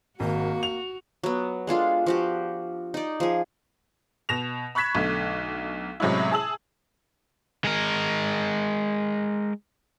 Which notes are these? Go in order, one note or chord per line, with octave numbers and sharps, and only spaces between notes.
G#1 A#3 F#4
F7
F#3 B3
G#3 D4 F4 A4
F3 F#4 G4
D#4 D5
F3 G#4
B2 A#6 E7 F7
B5 C#6 F#6 G#6 B6 E7
B1 D3 A3
A2 C3 F#3 G#3 C#4 E4
G#4 A5 E6 F#7
G#3 A#4